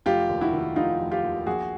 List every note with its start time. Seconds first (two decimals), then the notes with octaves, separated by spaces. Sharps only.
0.06 F1 F4 G4
0.29 D#2
0.41 E4 F#4
0.53 D#3
0.76 F1 D#4 F4
0.99 F1
1.11 F4 G4
1.23 D#2
1.46 A#1 F#4 G#4